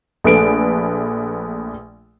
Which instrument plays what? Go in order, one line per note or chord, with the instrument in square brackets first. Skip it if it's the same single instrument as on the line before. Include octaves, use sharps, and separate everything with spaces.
[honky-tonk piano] A#1 A3 B4 D7